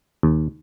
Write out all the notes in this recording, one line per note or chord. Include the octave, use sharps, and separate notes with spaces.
D#2